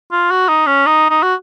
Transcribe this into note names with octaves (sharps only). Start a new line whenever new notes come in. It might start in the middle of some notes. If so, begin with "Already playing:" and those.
F4
F#4
D#4
C#4
D#4
D#4
F#4